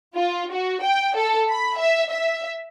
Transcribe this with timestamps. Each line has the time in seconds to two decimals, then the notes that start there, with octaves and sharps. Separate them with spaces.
0.15 F4
0.52 F#4
0.82 G5
1.16 A4
1.49 B5
1.79 E5
2.11 E5